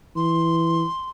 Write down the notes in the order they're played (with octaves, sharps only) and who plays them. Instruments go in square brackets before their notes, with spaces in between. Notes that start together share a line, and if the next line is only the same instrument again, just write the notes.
[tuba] E3 [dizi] C6